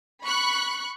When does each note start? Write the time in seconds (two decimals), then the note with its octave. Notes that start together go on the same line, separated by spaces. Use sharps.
0.24 B5 C#6 F#6